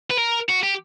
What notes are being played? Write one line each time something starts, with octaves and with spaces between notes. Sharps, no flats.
B4
A#4
F#4
G4